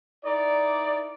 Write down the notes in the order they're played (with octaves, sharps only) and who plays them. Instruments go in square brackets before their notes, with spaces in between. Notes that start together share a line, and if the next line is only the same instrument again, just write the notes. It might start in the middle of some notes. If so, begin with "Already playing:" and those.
[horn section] D#4 E4 A#4 D5